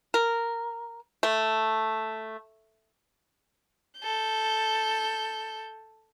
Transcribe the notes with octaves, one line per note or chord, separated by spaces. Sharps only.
A#4
A3
A4 G6